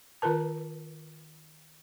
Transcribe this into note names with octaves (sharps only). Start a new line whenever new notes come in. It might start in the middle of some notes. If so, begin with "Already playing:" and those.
D#3 F4 A#4 B4 A5